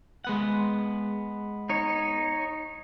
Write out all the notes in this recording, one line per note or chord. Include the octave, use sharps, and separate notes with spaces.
G#3 B3 F#5
D#4 C#5